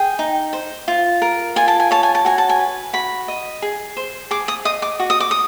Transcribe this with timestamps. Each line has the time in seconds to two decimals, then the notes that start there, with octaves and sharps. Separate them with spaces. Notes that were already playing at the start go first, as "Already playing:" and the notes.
Already playing: G#4 G5
0.19 D#4
0.53 C5
0.88 F4
1.22 A#4
1.56 F4 G#5
1.68 A5
1.80 G#5
1.91 C#5 A5
2.03 G#5
2.15 A5
2.25 F#4 G#5
2.38 A5
2.49 G#5
2.59 B4
2.93 F#4 B5
3.28 D#5
3.62 G#4
3.97 C5
4.31 G#4 D6
4.48 D#6
4.65 D#5 D#6
4.82 D6
5.00 F#4
5.10 D#6
5.20 D6
5.31 D#6